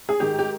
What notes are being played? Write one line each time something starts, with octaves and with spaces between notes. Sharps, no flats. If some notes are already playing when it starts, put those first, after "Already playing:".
G#4
G#2 D#3 G#3 G4
G4